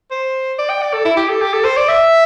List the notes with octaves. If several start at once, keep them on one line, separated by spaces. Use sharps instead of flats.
C5
D5
G5
D5
A4
E4
G4
A4
G4
A4
C5
D5
E5